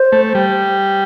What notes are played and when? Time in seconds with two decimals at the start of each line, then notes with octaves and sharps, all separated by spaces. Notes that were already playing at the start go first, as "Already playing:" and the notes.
Already playing: C5
0.12 A3
0.35 G3